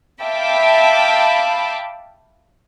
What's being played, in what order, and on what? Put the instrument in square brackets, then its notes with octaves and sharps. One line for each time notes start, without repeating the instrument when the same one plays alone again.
[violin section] E5 F5 G5 A5 B5 D6